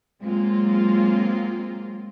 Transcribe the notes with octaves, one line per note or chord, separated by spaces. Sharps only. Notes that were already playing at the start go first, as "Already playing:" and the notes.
F#3 G#3 A#3 C4 F4